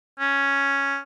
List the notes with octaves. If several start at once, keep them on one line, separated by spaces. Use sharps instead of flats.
C#4